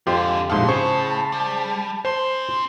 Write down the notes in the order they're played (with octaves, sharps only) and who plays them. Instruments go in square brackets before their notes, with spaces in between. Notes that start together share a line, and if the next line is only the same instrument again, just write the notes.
[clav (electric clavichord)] F2 F4 G4 [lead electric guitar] G#2 D3
[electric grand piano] A#1 G#2 F5 [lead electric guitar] B3 C6 [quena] A5
[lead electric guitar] A2 [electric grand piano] C#3 C5 C#6 [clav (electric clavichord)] G#4
[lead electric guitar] G3
[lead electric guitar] C#4 C6 [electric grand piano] C5